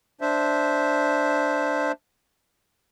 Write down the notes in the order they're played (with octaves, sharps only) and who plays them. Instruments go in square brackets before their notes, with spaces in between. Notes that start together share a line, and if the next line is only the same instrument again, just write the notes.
[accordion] D4 C5 E5